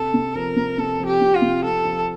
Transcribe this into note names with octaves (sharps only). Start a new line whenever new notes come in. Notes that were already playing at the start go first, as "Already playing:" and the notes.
Already playing: C3 A4
C3
F3 A#4
C3
C3 A4
F3
G4
C3
F4
C3
F3 A4
F3